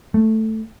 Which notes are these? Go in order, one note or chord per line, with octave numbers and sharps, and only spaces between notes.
A3